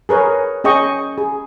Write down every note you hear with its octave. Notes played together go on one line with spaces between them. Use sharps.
G#4 A#4 B4 C#5
C#4 G#4 D#5 G5 C#6
G#4